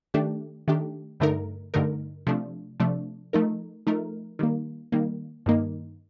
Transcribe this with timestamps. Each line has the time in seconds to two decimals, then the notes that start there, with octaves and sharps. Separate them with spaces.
0.14 D#3 A3 D4 G4
0.68 D#3 A3 D4 G4
1.20 G2 D3 A3 D#4 A#4
1.74 G2 D3 A3 D#4 A#4
2.27 C3 F3 A3 D4
2.80 C3 F3 A3 D4
3.33 F3 A3 D#4 A#4
3.87 F3 A3 D#4 A#4
4.39 D#3 G3 A#3
4.92 D#3 G3 A#3
5.46 G2 D#3 A#3 D#4